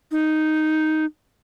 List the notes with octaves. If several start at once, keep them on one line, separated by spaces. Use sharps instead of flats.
D#4